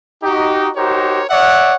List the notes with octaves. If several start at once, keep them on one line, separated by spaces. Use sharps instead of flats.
D#4 F#4 G4
D#4 F#4 G4 A#4 C5 C#5
C#5 D5 E5 F#5